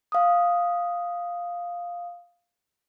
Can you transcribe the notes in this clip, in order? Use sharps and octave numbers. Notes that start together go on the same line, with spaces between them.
F5 D#6